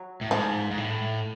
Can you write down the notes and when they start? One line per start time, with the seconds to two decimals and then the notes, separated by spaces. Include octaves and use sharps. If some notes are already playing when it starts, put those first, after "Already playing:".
Already playing: F#3
0.21 A2
0.31 G#2 F3
0.71 G#2
0.77 A2